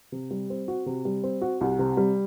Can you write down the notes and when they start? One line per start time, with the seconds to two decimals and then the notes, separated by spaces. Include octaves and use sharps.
0.12 C3
0.31 G3
0.50 C4
0.68 F#4
0.86 C3
1.05 G3
1.24 C4
1.42 F#4
1.61 C2
1.79 C3
1.97 G3